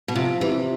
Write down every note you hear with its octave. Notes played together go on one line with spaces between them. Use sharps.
B2
C3 F3
C3 E3